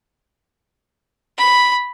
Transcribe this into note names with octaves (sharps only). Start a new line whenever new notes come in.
B5